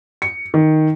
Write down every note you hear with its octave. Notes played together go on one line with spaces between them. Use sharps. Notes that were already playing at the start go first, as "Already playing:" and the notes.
C#7
D#3